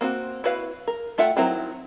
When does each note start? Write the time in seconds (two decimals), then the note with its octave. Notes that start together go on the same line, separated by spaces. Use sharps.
0.01 A#3 C4 F#4
0.44 E4 F#4 B4 F5
0.88 A#4
1.18 A3 F4 E5 F#5 G5
1.37 D#3 F#3 C4 E4 A#4